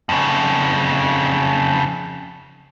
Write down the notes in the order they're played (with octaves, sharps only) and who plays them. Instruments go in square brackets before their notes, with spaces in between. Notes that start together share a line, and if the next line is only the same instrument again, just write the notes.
[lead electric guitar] F2 C#3